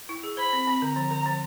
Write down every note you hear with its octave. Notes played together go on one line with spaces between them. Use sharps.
E4
G#4
C5 B5
C4
C4
D3 A#5
F3
D3
F3